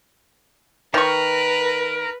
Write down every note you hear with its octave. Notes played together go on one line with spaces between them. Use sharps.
D#3 A#4 B4 C#6